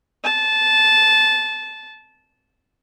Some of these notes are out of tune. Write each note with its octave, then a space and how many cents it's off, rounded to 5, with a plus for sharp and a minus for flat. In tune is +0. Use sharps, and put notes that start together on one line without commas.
A5 -15